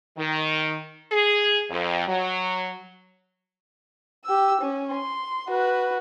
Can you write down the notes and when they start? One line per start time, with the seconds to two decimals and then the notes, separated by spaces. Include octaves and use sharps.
0.18 D#3
1.12 G#4
1.70 F2
2.08 F#3
4.25 G4 E6
4.61 C#4
4.93 C6
5.48 F#4 B4